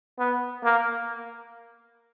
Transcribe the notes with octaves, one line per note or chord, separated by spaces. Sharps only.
B3
A#3